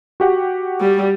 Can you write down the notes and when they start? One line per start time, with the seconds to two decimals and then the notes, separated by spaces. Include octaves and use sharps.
0.20 F#4 G4 F#5
0.81 G3